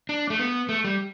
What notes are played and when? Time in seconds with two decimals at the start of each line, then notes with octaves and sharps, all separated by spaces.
0.09 D4
0.30 A3
0.39 B3
0.69 A3
0.84 G3